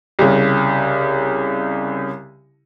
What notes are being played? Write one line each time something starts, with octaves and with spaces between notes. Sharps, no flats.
C2 C#3